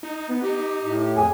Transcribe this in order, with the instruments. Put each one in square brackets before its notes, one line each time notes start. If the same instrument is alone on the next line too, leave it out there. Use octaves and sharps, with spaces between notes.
[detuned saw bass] D#4
[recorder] B3
[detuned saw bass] D#4 [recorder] G4
[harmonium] A2
[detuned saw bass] F2 [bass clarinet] G#4